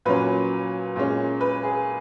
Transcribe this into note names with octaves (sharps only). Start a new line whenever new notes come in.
A#2 F#3 C#4 B4
A#2 G#3 C#4
B4
G#4